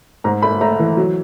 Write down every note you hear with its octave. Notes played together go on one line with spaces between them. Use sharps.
G#2 A#5
A3 B5
A3 A#5
E3
F#3